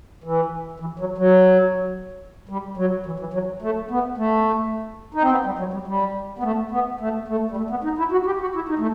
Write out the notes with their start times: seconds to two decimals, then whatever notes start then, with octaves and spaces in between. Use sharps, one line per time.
0.24 E3
0.80 E3
0.99 F#3
1.18 F#3
2.49 G3
2.77 F#3
3.06 E3
3.20 E3
3.34 F#3
3.62 A3
3.91 B3
4.18 A3
5.14 D#4
5.22 C4
5.31 B3
5.45 G3
5.59 F#3
5.73 G3
5.87 G3
6.39 B3
6.43 A3
6.71 B3
7.00 A3
7.28 A3
7.51 G3
7.57 A3
7.70 B3
7.84 D#4
7.98 E4
8.12 F#4
8.26 G4
8.41 F#4
8.55 E4
8.69 D#4
8.79 A3